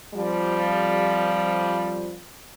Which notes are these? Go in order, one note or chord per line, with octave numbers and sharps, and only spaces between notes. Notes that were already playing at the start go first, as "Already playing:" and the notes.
F2 F3 G3